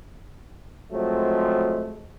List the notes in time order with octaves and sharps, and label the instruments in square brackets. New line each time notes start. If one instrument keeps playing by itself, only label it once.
[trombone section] F3 F#3 G#3 A3 C4